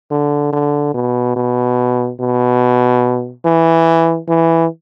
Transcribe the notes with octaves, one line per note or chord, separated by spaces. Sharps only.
D3
D3
B2
B2
B2
E3
E3